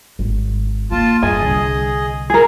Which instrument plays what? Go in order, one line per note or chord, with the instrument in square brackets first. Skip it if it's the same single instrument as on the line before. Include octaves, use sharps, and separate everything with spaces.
[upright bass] G#1
[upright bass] D#3 A#3 [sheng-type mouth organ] F4 A5
[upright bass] G2 [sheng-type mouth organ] G#4 D#5 [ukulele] G#5
[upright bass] C2 D3
[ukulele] G#4 A#4